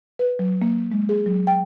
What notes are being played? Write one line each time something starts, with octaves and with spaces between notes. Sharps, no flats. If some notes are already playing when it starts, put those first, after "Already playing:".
B4
F#3
A#3
G#3
G#4
F#3
G5